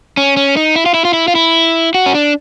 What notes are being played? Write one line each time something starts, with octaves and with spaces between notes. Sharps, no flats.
C#4
C#4
D#4
E4
F4
E4
F4
E4
F4
E4
F#4
C#4
D4